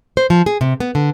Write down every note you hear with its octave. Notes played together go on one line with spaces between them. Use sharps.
C5
F3
G#4
C3
B3
D3